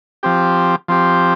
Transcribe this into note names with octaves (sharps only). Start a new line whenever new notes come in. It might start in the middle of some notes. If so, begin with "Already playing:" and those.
F3 C4 G4
F3 C4 G4